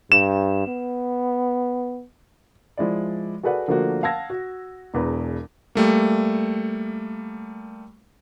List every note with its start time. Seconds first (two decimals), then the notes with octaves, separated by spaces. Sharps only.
0.12 G2 E7
0.67 B3
2.77 F3 G#3 E4 D5
3.43 F#4 G#4 A4 B4 D5 F#5
3.68 D3 F3 A3 A#3 D4 F#4
4.03 F5 F#5 A5 E6 G#6 A#6
4.30 F#4
4.94 E1 E2 B4 A#5
5.75 G3 A3 A#3